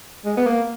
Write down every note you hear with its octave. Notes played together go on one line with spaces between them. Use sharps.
G#3
B3
A#3